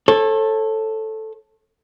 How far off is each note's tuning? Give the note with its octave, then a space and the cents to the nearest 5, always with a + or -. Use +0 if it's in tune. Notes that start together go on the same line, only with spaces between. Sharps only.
A4 +0 C#5 -35